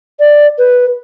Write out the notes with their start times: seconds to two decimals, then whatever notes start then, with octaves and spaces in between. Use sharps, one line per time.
0.20 D5
0.58 B4